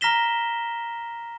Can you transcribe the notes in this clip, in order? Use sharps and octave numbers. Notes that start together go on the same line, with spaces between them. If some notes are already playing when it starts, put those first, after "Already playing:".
A#5 F6 A#6 B6 E7 G7